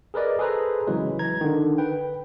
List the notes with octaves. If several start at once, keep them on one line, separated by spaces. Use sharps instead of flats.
G#4 A#4 B4 D5 D#5
G#4 A4 B4 C5 A#5
C#3 E3 F#3 G#3 B4
E3 A#5 G#6
D3 D#3
B4 G5